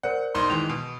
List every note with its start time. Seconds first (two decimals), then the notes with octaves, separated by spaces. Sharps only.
0.03 A#4 C5 D5 F#5
0.35 B1 D#4 C6
0.50 D#3 E3 G#3 F7
0.69 B2